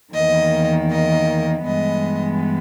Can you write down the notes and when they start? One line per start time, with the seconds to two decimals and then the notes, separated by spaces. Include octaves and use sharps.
0.13 E2 D#3 A#3 D#5
0.89 D#5
1.65 G2 E3 G#3 B3 D#5